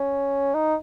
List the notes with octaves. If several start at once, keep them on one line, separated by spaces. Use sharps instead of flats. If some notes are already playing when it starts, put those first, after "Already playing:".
Already playing: C#4
D#4